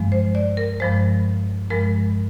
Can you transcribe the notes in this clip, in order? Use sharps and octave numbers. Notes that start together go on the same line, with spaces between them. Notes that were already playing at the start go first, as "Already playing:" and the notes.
Already playing: G2 F3 G#3
C5
D5
A#4
G2 F3 G#3 C5
G2 F3 G#3 A#4